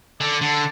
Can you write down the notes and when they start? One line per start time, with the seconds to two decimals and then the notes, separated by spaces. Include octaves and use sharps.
0.20 D3 D5
0.41 D3